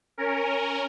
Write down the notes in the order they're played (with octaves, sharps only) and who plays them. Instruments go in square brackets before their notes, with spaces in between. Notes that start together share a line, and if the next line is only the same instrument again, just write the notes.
[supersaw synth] C#4 A#4